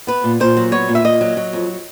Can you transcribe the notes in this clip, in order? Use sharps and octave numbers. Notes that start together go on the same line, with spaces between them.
B3 B4
A#2
A#2 C5
F#3
B3 C#5
A#2
E5
A#2 D#5
F#3
F#3
F2